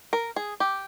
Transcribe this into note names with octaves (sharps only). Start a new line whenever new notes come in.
A#4
G#4
G4